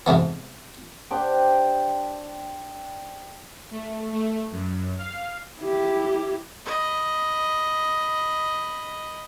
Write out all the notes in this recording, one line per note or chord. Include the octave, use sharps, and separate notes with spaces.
G#2 C3 A3 B3
D4 G4 C5 G5
A3
A3
F#2
F5
E4 G4
D#5 B5